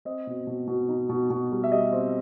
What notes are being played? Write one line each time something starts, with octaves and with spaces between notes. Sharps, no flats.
C4 D#5
B2
B2
B2
D#4
B2
B2
G3
E5
G3 D#5
C4